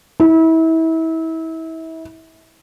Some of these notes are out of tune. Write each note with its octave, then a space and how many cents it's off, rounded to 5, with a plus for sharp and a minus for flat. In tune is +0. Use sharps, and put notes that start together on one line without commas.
E4 -30